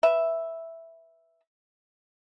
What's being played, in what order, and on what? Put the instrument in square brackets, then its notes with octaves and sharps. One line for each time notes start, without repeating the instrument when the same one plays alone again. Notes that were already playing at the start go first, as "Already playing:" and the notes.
[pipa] B4 E5